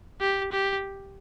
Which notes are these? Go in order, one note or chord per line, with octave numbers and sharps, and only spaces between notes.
G4
G4